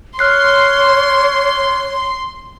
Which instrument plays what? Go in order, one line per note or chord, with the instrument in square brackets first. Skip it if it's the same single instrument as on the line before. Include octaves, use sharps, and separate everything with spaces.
[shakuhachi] C#5 [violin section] C6 [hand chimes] F6 F#6 C7